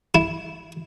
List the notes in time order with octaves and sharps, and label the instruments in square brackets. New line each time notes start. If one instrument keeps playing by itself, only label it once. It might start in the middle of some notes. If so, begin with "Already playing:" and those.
[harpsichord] E4